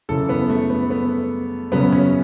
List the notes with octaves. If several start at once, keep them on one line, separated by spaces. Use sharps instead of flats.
F#2 C#3 E3 A4
B3
A3
B3
B3
F#2 C#3 F#3 B3
C#4